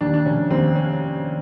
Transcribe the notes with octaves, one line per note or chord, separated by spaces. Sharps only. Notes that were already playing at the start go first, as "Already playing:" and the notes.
D#2 D4
D4
F1 C#4
D#2 C4
C#4